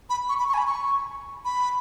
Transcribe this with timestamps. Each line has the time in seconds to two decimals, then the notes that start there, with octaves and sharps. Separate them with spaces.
0.10 B5
0.29 C#6
0.39 B5
0.49 C#6
0.54 G#5
0.58 B5
0.67 C#6
1.45 B5